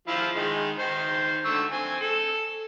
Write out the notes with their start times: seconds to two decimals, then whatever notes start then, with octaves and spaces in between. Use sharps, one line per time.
0.08 F3 E4 F5
0.36 D#3 G#3
0.79 D#3 C5
1.45 D3 C#6 E6
1.72 C4 G#5
2.00 A4